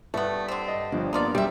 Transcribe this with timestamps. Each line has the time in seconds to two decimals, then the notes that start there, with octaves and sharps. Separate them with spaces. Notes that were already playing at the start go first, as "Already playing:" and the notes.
0.14 G2 A3 B3
0.48 D3 C4
0.68 D#5
0.92 G1 F3 G3 D4
1.13 A#3 B3 D#4 F4 D5
1.35 F#2 G3 C4 E5